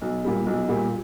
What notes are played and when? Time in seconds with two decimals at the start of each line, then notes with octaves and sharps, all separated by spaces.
0.02 B1
0.24 A#2 G3
0.46 B1
0.69 A#2 G3